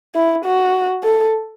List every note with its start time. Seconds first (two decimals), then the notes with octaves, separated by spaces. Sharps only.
0.15 E4
0.44 F#4
1.04 A4